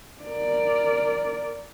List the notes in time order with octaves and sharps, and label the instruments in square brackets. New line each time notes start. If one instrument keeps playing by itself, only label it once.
[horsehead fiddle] A#4 D5